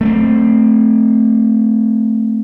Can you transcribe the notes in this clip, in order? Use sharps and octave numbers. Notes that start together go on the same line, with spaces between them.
A3 A#3 C4